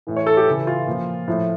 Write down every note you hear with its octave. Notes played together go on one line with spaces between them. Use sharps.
A2 E3
C#5
A4
G4
C#3 E3
F4
A#2 F3
A2 F3